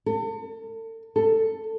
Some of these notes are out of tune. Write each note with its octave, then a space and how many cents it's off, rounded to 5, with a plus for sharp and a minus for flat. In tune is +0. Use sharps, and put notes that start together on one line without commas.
A4 +40
A4 +15